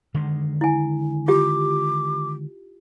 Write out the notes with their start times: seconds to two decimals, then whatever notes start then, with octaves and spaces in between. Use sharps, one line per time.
0.14 D3 D#3 G#3
0.61 E4 G#5
1.28 F4 G4 D6